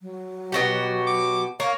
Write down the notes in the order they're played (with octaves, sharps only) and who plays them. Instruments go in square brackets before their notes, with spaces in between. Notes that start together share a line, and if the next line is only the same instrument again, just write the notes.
[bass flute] F#3
[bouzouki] B2 F#4 G4
[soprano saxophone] D6
[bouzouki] A#3 [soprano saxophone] C#5 [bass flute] F5